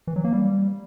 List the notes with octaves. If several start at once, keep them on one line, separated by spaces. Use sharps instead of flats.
E3
F#3
A#3
G3